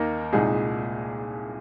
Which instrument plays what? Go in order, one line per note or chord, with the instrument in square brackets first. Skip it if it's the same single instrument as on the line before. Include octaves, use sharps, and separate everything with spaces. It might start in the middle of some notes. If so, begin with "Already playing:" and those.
Already playing: [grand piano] D#2 D#3 A#3 D#4 A#4
C2 A#2 G#3 D#4 G#4